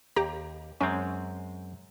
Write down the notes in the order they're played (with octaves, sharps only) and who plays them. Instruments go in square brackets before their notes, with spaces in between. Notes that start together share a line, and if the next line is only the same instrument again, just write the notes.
[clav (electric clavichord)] D#2 [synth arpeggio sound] G4 A#5
[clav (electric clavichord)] F#2 G#3 C4 [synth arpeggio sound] C#4